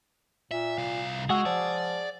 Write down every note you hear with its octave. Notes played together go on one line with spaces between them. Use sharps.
A#2 E5
C2 F5
G#3 F#4 G#4 F#5 E6
F3 D5